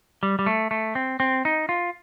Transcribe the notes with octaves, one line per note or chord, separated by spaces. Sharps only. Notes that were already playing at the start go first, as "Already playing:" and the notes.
G3
G3
A3
A3
C4
C4
D#4
F4